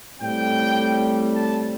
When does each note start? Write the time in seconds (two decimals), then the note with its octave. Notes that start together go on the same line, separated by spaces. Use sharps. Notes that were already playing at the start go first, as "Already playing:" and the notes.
0.19 A2 G3 C4 G5
1.34 A5